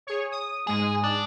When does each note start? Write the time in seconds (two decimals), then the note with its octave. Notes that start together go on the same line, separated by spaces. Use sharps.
0.07 G#4 C#5
0.32 D#6
0.67 G#2 G#3 G#4 D#6
1.04 D4